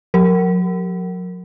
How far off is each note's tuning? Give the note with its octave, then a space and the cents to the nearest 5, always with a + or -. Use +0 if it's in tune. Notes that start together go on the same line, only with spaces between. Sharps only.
F#3 -40 A#4 -15